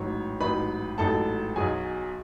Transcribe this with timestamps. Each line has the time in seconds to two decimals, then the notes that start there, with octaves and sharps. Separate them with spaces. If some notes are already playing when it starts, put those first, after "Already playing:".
Already playing: A1 G#2 F#3 C#5
0.40 A1 G#2 F#3 B4 B5
0.98 A1 G#2 F#3 A4 A5
1.56 B1 B2 F#3 G#4 G#5